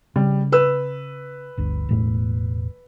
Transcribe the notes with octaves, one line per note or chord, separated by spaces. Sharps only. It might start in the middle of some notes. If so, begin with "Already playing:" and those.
C#3 G3
B4 E6
G1 D2
E1 A2 A3